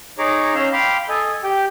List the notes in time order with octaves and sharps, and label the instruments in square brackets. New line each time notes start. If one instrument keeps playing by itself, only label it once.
[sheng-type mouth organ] D#4 G#4 C#5 A#5 D6
C#4 F5 E6 G6
F5 G5 B5 C6 D6
A4 D#5 G#5
G4 G5